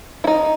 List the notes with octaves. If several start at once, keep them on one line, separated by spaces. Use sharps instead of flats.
E4
D#4